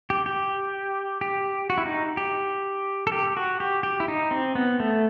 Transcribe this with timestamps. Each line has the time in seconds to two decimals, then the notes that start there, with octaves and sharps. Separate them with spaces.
0.10 G4
0.26 G4
1.21 G4
1.70 F#4
1.78 E4
1.86 D#4
2.17 G4
3.07 A4
3.12 G4
3.37 F#4
3.60 G4
3.83 G4
4.00 E4
4.08 D#4
4.31 C4
4.55 B3
4.80 A3